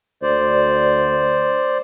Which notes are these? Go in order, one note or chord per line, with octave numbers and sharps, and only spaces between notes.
D2 C5 D5